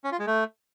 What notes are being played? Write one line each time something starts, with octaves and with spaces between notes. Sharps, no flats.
C#4
F4
G#3
A3